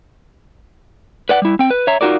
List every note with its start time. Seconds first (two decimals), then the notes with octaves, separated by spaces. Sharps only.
1.29 B4 D5 F#5
1.42 G3 E4
1.59 C4 G5
1.71 B4
1.87 C#5 E5 A#5
2.01 D#4 F4 F#4 A#4 D5